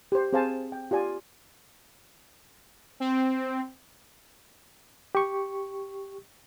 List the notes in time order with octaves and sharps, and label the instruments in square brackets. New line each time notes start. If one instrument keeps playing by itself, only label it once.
[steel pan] G4 C5
C4 G#4 C5 F5 G#5 A5
G5
F4 G4 D5 G#5
[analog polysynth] C4
[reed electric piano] G4 C#6